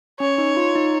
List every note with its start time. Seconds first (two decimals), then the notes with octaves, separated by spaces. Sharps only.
0.20 C#4 C#5
0.38 D#4
0.57 F4
0.76 D#4